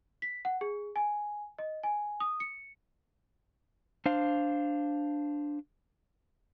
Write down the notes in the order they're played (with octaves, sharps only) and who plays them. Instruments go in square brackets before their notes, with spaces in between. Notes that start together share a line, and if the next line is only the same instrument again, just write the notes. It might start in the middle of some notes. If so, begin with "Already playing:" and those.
[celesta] B6
F#5
G#4
G#5
D#5
G#5
D#6
C#7
[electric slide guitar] D4 C5 F5